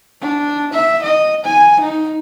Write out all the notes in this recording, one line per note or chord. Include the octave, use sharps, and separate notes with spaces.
D4
E5
D#5
G#5
D#4